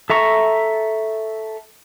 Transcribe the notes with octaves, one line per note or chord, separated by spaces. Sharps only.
A4 E5 A#5 C#6